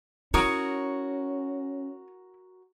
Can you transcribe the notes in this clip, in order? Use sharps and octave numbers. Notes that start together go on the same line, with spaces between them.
C#4 E4 F#4 A#4 C#5 D#6